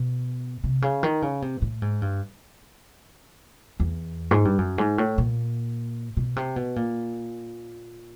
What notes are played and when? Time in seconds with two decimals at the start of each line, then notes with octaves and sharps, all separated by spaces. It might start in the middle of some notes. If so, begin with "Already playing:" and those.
Already playing: B2
0.64 C3
0.82 C#3
1.03 D#3
1.22 C#3
1.42 C3
1.62 A2
1.82 G#2
2.02 G2
3.80 E2
4.31 G#2
4.45 G2
4.59 F#2
4.78 G#2
4.98 A2
5.18 A#2
6.17 B2
6.36 C3
6.56 B2
6.76 A#2